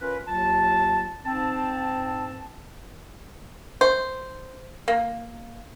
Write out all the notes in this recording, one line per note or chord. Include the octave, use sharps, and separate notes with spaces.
C#4 F4 A#4 B4
D#2 F#3 F4 A5
G#2 C4 A5
C5
A#3